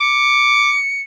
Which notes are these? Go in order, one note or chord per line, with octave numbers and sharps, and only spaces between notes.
D6 C#7